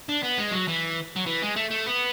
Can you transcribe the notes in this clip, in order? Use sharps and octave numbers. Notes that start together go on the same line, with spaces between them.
D4
B3
G#3
F#3
E3
F#3
E3
G#3
A3
A3
B3